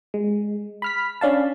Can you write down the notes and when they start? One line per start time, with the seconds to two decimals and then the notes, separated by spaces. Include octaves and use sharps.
0.14 G#3
0.82 B5 F6 B6
1.21 C#4 D4 F5 A5